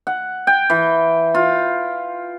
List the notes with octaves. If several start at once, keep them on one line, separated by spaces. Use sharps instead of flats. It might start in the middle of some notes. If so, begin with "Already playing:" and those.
F#5
G5
E3
F4